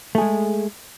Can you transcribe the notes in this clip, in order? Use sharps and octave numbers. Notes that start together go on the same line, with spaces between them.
G#3 A3 G#4